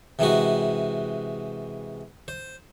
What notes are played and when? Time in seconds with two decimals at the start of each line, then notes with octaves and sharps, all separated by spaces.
0.19 C3 E3 G#3 F#4
2.28 C5